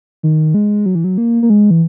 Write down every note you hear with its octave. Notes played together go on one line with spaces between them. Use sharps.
D#3
G#3
F#3
E3
F#3
A#3
A#3
G#3
E3